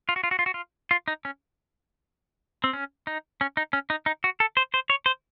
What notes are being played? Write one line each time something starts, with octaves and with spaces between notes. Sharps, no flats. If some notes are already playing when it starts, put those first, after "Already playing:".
F4
F#4
F4
F#4
F4
F#4
F4
F4
D#4
C#4
C4
C#4
D#4
C#4
D#4
C#4
D#4
D#4
F#4
A4
C5
C5
C#5
C5